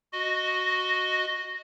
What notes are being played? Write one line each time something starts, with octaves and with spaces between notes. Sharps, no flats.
F#4 D#5